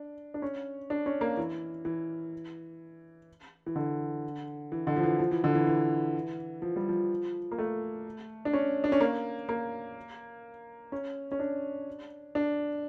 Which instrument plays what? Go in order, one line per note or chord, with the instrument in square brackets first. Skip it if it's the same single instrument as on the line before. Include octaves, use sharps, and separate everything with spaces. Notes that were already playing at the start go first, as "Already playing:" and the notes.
Already playing: [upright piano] D4
D4
C#4
D4
C#4
A#3
E3
E3
E3
D3
E3
D3
F3
E3
F3
E3
D3
E3
E3
F3
G3
F3
A#3
A3
D4
C#4
D4
C#4
A#3
A#3
C#4
C#4
D4
D4